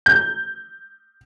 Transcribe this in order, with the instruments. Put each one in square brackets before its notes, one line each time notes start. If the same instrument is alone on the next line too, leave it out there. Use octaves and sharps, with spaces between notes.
[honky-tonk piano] G6